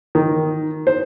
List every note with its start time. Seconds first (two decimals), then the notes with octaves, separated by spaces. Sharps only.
0.15 D#3
0.87 C5